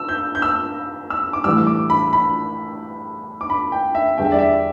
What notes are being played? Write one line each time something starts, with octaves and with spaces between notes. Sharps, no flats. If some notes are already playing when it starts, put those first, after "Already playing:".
Already playing: E6
G6
G6
E6
E6
D6
A2 E3 G3 E6
D6
B5
B5
D6
B5
G5
E5
E2 D3 G3 G5
E5
D5
E5